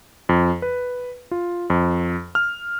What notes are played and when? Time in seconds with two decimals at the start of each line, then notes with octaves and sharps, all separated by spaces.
0.29 F2
0.62 B4
1.31 F4
1.70 F2
2.35 F6